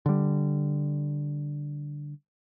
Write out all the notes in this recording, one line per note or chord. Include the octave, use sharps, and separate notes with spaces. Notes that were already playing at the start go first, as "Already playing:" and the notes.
D3 G3